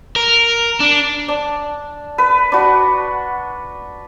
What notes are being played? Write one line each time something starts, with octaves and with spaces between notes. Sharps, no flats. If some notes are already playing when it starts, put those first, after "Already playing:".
A#4
D4
D4
B4
D4 F#4